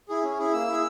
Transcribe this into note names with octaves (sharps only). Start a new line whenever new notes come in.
E4 G#4
C#4
E4 G#4
A#3 E6
E4 G#4